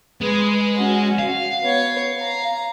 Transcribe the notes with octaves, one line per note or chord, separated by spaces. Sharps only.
G#3 B4
C#4 F#4
F5
B3 C#5
A#5